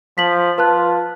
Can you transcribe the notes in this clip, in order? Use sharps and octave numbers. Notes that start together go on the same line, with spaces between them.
F3 B6 F#7
F4 B4 A5 F#6